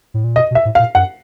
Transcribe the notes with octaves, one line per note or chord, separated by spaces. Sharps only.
A2
A#2
B2 D#5
B2
E5
A2
F5
A#2
F#2 F#5